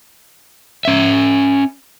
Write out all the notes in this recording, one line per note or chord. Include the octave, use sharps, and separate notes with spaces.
C#4 E5